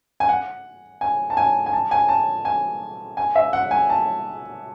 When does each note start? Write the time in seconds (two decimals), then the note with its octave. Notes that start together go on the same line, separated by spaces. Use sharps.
0.20 G#5
0.29 F#5
1.01 G#5
1.30 A5
1.37 G#5
1.66 G#5
1.73 A5
1.91 G#5
2.09 A5
2.45 G#5
3.17 G#5
3.36 E5
3.53 F#5
3.71 G#5
3.90 A5